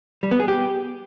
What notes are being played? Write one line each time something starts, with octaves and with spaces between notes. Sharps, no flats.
G3
B3
G#4
G4